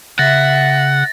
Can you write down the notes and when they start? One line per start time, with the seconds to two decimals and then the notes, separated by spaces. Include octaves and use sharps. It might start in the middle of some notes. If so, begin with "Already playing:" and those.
0.19 C#3 E5 F#5 A6 A#6